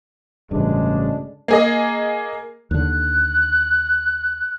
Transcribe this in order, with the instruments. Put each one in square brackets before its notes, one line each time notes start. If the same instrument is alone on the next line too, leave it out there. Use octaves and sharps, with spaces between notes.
[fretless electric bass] A1 G2 [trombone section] D2 G#3 D4 [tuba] C#3
[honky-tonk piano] A#3 G#4 D#5
[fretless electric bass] D#2 D3 [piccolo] F#6